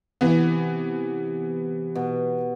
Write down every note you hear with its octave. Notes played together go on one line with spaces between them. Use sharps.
C3 E3 B3
B2